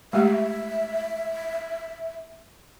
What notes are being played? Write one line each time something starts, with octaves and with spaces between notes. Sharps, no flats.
G#3 A3 G4 E5